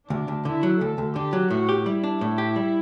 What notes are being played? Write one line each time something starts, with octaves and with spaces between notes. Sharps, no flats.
D2 D4
D2
D3 E4
F#3
D2 A4
D2
D3 G4
F#3
A2 F#4
G4
G3 E4
D4
A2
G4
G3